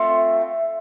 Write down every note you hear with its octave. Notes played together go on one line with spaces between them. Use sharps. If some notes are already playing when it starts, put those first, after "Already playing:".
Already playing: A3 C4 F4